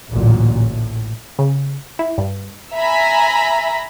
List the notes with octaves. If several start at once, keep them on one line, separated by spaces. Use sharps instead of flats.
A1 D2 A#2 F#3
A2
C#3
E4
G2
E5 G#5 A#5 B5